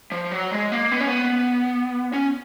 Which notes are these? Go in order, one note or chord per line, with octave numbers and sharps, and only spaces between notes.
F3
F#3
G#3
A#3
B3
C#4
B3
C#4